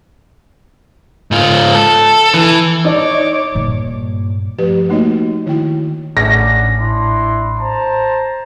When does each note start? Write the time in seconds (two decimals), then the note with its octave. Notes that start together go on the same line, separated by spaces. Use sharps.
1.31 G#2 F4
1.74 A4
2.34 E3
2.85 D#4 C#5 D5 D6
3.55 G2 A#2
4.59 F3 A3 G4 B4
4.89 A3 A#3 D#4 F#4 C#5 D#5
5.46 D#3 E4 F#4 G5
6.17 A1 C#4 D4 F#5 A#6
6.78 D4 E4 C6
7.59 C5 A5 A#5